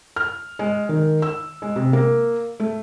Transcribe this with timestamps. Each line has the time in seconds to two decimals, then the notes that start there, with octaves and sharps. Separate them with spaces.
0.16 F6
0.59 G#3
0.89 D#3
1.22 E6
1.62 G#3
1.76 C3
1.93 A#3
2.60 A3